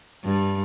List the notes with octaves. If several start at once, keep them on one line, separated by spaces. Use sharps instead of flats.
G2